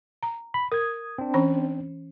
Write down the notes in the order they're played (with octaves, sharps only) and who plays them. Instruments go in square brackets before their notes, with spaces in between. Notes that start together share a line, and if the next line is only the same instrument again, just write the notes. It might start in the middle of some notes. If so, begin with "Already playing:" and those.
[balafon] A#5
[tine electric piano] B5
[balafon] A#4 [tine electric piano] D#6 G#6
[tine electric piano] C4 D4
[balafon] E3 C#4 B5